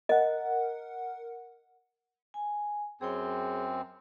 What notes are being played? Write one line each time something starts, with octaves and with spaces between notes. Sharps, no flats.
A#4 D#5 F#5
G#5
F#2 C4 G#4 C#5 G5